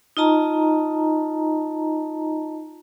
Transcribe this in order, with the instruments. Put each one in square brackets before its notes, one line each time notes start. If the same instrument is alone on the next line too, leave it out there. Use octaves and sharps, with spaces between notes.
[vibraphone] D#4 F4 D#5 A5 A#5